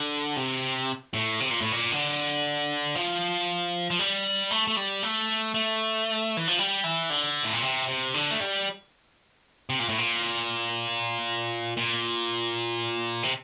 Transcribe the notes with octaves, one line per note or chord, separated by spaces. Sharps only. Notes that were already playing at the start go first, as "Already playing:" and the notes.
Already playing: D3
C3
A2
C3
A#2
A2
A#2
D3
F3
F3
G3
A3
A3
G3
A3
A3
E3
F3
G3
E3
D3
A2
A#2
C3
C3
D3
A3
G3
C3
A#2
A2
A#2
A#2
C3